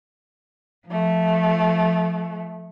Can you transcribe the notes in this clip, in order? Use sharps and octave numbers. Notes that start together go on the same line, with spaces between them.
F3 A3